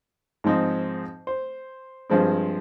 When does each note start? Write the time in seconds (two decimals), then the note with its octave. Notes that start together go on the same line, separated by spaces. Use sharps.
0.44 G#2 F3 C4 D#4
1.27 C5
2.10 G2 F3 G#3 C4